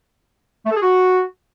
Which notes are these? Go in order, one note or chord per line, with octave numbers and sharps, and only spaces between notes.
A3
A4
G#4
F#4